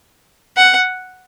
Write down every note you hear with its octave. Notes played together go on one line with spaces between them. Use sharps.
F#5